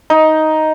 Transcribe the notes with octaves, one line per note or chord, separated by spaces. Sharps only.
D#4